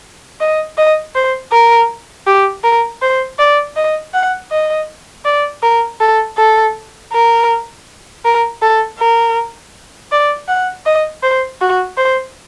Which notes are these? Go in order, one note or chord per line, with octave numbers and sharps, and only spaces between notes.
D#5
D#5
C5
A#4
G4
A#4
C5
D5
D#5
F#5
D#5
D5
A#4
A4
A4
A#4
A#4
A4
A#4
D5
F#5
D#5
C5
F#4
C5